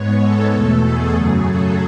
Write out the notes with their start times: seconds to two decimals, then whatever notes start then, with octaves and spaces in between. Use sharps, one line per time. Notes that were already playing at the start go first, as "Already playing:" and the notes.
Already playing: G#2 G#3 B3 C#5
0.21 A4
0.51 E2 B2 A3
0.83 G#4
1.13 F#2 C#3 F#3 A3 G#4
1.45 A4